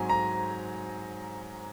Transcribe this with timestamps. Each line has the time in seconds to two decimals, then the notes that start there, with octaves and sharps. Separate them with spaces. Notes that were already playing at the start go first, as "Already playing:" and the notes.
Already playing: G#2 F#3 C4 G#5
0.10 A#5